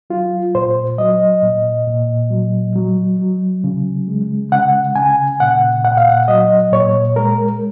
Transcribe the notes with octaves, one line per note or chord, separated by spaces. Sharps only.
F#3 F4
A#2 C5
F#3 D#5
A#2
A#2
F#3
F#3
F#3
C#3
G#3
C#3 F#5
C#3 G#5
A#2 F#5
A#2 F#5
F5
F#5
F#3 D#5
A#2 C#5
G#3 A#4